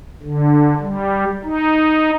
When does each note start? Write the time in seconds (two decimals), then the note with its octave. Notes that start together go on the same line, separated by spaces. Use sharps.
0.23 D3
0.81 G3
1.45 D#4